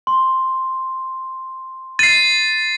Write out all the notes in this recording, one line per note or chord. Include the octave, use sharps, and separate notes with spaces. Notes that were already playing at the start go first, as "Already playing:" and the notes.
C6
A6 C7 D#7